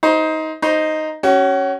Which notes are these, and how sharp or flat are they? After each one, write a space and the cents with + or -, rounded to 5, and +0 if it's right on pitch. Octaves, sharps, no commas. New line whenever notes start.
D#4 +20 C5 +0
D#4 +0 C5 +0
C#4 +0 F#4 +35